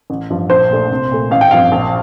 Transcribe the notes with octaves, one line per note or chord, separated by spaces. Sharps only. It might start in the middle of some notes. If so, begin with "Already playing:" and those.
A1
G2 F3
A#1 C5
A#2 A3 D4
C2
A#2 A3
A1 F5
G5
G2 F3 C4 F5
A#1